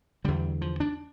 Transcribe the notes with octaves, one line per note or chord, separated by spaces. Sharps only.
E2 D3 G3
F3
D4